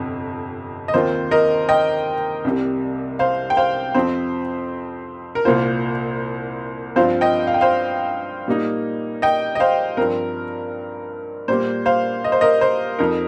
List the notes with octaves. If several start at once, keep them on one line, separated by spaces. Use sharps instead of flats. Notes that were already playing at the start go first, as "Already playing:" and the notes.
Already playing: G1 F2 C3
D#5
D#2 D#3 C4 F4 C5
A#4 D#5
D#5 G5
C2 C3 G3
C5 F5
G5
C5 F5
F2 F3 C4 C5
A#4
C2 A#2 A#3 F4 C5
G2 F3 C4 F4 C5 F5
D#5 G5
F5
G5
C5 F5
A#2 G3 A#3 D#4
D#5 G5
D#5
C5 F5
G2 F3 C4 A#4
A#2 G3 A#3 C5
C5 F5
D#5
C5
A#4 D#5
C5
F2 F3 D#4 A#4